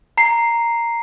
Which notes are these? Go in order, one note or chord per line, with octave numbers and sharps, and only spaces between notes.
A#5 C7